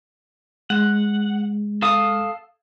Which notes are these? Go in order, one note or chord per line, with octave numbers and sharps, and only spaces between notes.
G#3 F#5
A4 F5 D#6